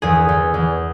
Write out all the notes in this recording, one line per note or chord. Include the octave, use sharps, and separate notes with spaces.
E2 G#4
E2
E2